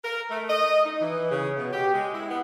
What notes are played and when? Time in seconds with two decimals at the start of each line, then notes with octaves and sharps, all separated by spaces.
0.04 A#4
0.31 A3
0.49 D#5
0.85 D#4
1.01 E3
1.31 C#3
1.59 B2
1.73 G4
1.94 G#3
2.14 E4
2.29 B3